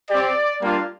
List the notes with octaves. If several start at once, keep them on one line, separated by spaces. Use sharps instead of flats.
C4 G4 D5
G3 A#3 D4 F4